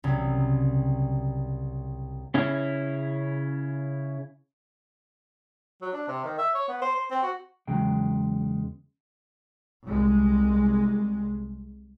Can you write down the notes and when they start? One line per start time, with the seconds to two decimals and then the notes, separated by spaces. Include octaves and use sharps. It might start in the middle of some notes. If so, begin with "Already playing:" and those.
0.04 C2 C#3 F#3
2.34 C#3 C#4 E4
5.82 F#3
5.93 D4
6.08 C3
6.24 D#3
6.38 E5
6.55 C#5
6.68 B3
6.82 C5
6.95 C5
7.11 C4
7.23 F#4
7.67 E2 C#3 F#3 G#3 G5
9.86 C2 G#3